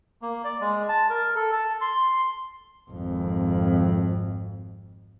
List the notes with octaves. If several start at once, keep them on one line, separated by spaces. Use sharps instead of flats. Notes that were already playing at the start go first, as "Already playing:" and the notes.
A#3
D5
G#3
A5
A#4
A4
A5
C6
G#1 F2